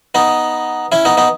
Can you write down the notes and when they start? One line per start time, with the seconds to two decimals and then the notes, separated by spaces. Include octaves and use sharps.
0.15 B3 D#4
0.92 C#4 E4
1.05 B3 D#4
1.17 B3 D#4